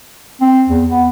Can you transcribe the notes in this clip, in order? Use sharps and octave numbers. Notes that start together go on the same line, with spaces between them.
C4
E2
B3